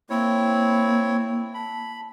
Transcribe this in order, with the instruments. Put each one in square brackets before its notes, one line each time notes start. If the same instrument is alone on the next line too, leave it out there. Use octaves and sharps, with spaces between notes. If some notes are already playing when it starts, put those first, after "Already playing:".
[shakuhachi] A#3 [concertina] C4 E4 C#5
[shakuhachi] A5 [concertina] B5